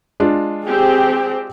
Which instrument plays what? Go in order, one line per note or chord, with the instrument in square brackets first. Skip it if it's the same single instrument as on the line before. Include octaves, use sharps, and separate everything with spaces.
[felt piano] G#3 D4 F4
[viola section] C4 G4 [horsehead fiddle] G#4 G5